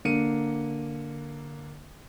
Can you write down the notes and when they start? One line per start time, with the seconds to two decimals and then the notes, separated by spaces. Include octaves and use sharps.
0.05 D3 A#3 C#7 D#7